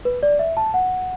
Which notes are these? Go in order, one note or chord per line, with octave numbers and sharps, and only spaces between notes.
B4
D5
E5
A5
F#5